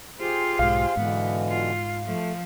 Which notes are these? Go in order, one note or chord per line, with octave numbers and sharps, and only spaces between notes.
F4 G4 G#4 C5
B1 G#2 F5
G#2 B2 D3 E3 B3
F4
F3 A3